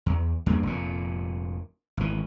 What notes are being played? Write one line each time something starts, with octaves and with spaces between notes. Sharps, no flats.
E2
E2 G2 A#3
F1 A#2
G#1 E3